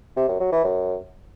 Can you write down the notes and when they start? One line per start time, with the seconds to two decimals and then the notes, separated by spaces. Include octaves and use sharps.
0.17 C3
0.28 F#2
0.40 F#3
0.52 E3
0.64 F#2